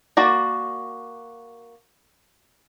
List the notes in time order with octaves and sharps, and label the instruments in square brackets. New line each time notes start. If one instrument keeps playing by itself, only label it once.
[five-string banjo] A#3 F#4 D5